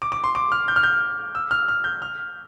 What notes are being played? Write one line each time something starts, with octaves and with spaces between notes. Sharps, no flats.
D6
D6
C6
D6
F6
G6
F6
G6
E6
F6
F6
G6
F6